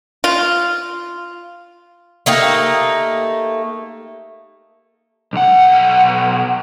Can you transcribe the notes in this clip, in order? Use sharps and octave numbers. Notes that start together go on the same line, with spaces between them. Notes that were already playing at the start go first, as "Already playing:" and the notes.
F4
A3 A#3 D#4 G4
B1 F#5